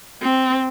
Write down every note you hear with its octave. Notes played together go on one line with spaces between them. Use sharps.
C4